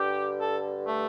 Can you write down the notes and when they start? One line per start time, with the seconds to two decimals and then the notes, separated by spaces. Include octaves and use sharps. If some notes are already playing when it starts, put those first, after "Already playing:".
Already playing: G2 D3 G4
0.40 A4
0.88 A3